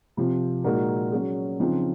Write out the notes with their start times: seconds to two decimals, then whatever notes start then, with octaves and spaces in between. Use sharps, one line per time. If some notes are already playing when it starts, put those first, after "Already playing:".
0.17 C3 F3 C4
0.64 A#2 G#3 D#4 F#4 A#4
1.11 F#3 C#4 G#4
1.59 C#3 F3 C4 D#4